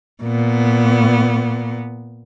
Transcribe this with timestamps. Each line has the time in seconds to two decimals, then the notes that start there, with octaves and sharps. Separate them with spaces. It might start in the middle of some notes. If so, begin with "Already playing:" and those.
0.23 A#2 B3